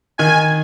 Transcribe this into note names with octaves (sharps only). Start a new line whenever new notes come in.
D#3 G#5